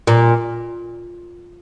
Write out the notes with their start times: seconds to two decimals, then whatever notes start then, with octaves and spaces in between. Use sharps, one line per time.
0.07 A#2